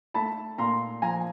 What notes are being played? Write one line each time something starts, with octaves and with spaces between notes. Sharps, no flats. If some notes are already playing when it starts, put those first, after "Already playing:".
A3 A5 B5
A#2 A#5 C6
F3 G#5 A#5